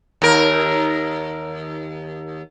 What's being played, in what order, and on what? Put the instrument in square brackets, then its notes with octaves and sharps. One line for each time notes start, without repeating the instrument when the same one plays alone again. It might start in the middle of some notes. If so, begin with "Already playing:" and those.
[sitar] D#2 A#4